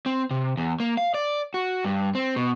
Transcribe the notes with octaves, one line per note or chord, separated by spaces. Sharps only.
C4
C3
E2
A#3
F5
D5
F#4
G2
C4
B2